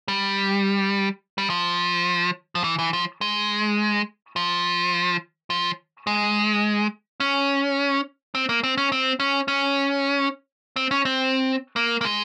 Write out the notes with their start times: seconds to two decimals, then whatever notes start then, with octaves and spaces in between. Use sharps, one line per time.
0.08 G3
1.38 G3
1.50 F3
2.55 F3
2.64 E3
2.79 E3
2.93 F3
3.21 G#3
4.36 F3
5.50 F3
6.07 G#3
7.20 C#4
8.35 C4
8.49 A#3
8.64 C4
8.78 C#4
8.92 C4
9.20 C#4
9.48 C#4
10.76 C4
10.91 C#4
11.05 C4
11.76 A#3
12.01 A#3
12.05 G#3